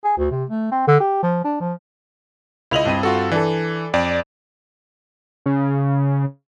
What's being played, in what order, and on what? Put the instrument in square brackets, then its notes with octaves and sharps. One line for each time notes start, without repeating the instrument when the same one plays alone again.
[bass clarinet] G#4
D2
C3
A3
C4
D3
G4
F3
D4
F3
[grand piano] C#2 F7 F#7 [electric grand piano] E4 D#5
[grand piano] G2 C4 D#7
[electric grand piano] F4 F#4 A4
[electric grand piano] E3 [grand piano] D4 A4
[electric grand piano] F2 D5
[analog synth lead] C#3